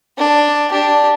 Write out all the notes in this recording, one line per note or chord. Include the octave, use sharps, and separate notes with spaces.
D4
D4 G4